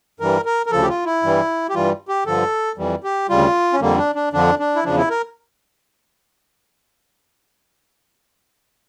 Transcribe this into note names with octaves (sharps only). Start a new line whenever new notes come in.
G2 E3 G3 A#4
A#4
A#4
D2 C#3 F3 A4
G4
F4
E4
G2 E3 G3
G4
G2 E3 G3 F4
G4
G2 D3 F3 A4
F2 E3 G3
G4
D2 C#3 G3 F4
C#4
F2 D3 G3 A#3
D4
D4
F2 D3 F3 D4
D4
E4
E2 C#3 F3 D4
E4
A#4